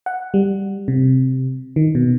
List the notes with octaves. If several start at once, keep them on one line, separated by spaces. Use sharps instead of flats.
F#5
G3
C3
D#3
B2